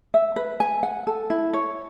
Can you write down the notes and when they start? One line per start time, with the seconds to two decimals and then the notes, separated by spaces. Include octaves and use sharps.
0.14 E5
0.36 B4
0.60 G#5
0.83 F#5
1.07 A4
1.30 E4
1.53 C#5